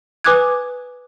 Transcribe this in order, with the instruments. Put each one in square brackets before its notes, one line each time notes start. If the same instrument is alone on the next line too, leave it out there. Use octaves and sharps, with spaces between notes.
[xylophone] B4 G#5 D6 D#6 F#6 G#6